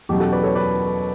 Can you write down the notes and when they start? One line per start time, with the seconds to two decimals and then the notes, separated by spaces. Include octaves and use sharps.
0.09 E2 B2 F#3 C#4 G4
0.20 F#4 A4
0.32 B4 D5
0.43 A4 C#5
0.55 B4 D5